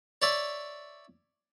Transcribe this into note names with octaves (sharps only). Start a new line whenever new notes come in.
C#5 D5 E5